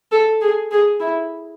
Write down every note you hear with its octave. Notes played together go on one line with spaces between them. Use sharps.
A4
G#4
G#4
E4